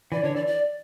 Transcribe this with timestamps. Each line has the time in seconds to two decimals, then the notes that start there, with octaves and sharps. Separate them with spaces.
0.12 E3 D5
0.24 D3 C#5
0.35 E3 D5
0.47 D5